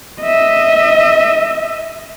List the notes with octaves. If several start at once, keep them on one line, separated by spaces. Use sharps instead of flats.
D#5 E5